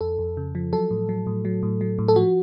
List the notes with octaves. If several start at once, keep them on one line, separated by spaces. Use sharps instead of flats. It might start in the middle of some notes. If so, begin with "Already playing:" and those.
F2 A4
F2
C#3
F3
F#3 A4
A2
F#3
A2
F#3
A2
F#3
A2
A4
F3 F#4